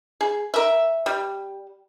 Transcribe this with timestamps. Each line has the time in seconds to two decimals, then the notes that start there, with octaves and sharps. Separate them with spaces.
0.21 G#4
0.54 A#4 E5
1.06 G3